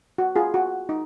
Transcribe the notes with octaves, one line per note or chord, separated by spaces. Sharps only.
F#4
F4 G#4
F#4
D#4